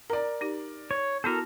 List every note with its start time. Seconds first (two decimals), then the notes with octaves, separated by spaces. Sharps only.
0.10 A#4 D5 A#5
0.41 D#4 G4
0.91 C#5
1.24 B3 E4 F#4 A4 A#4